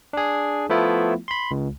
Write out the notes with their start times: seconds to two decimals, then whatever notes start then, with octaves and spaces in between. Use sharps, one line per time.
0.13 D4 G#4
0.69 F3 A3 B3 E4 F4
1.28 B5 C6
1.51 C#2